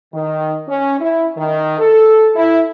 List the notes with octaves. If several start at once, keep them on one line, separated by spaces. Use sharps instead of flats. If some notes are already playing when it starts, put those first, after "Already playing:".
D#3
C#4
E4
D#3
A4
E4